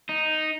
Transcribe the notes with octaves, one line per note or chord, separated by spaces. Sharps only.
D#4